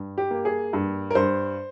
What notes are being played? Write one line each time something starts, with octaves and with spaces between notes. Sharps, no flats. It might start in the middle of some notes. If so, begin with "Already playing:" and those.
Already playing: G2
G4
A#3
G#4
G2
A#4
G2 C5